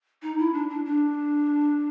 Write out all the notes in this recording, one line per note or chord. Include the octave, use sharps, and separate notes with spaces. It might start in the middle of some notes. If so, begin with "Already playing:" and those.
D#4
E4
D4
D4
D4